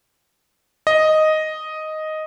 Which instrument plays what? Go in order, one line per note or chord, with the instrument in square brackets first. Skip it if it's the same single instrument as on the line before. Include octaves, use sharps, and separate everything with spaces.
[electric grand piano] D#5